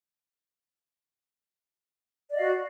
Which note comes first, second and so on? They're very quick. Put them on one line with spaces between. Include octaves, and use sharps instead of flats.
D5 D#5 F5 F#4